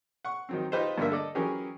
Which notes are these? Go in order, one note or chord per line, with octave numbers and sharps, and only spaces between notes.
F#5 C#6
D#3 F#3 C4
D#4 F4 G4 B4 C5
G2 D3 A#3 E5
A4 D5 D#5
E3 F#3 C#4 G4 G#4 A#4